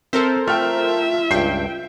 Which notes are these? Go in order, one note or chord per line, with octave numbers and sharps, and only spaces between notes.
C4 A4 A#4 C5 E5
A3 F4 E5 G5 F6
C#2 G2 G5 G6 C7